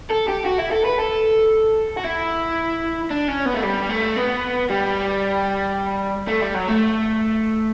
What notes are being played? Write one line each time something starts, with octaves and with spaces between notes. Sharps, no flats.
A4
G4
F#4
E4
A4
B4
A4
F#4
E4
D4
C#4
B3
A3
G3
A3
B3
G3
A3
G3
F#3
A3